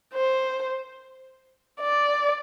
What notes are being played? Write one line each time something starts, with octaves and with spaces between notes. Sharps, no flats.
C5
D5